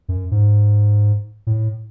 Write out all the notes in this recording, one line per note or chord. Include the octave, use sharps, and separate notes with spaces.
F#2
G#2
A2